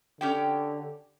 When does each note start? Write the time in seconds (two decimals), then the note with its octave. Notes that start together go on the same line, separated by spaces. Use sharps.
0.21 D3 C#4 G4 G5